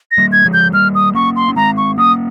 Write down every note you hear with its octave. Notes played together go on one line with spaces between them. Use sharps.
A#6
G3 A#3
G#6
F3 G#3
G6
G3 A#3 F6
D#6
A#3 C#4 C#6
C6
C#4
G#3 C4 A#5
C#6
A#3 C#4 D#6